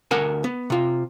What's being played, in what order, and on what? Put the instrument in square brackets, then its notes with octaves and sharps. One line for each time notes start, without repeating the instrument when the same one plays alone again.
[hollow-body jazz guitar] D2 A#4 F#5 G#5 A#5
B3
C3 F4